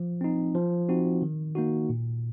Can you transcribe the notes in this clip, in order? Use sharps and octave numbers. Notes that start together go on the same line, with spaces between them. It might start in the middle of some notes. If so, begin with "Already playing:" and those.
Already playing: F3
C4 D#4
F3
C4 D#4 F#4
D#3
A#3 D#4 F#4
A#2